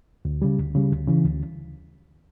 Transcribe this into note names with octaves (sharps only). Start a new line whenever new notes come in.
D2
C#3 G3
D2
C#3 G3
D2
C#3 E3
D2